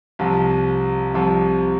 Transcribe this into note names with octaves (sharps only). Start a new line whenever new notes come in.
C2 C3 F3
C2 C3 F3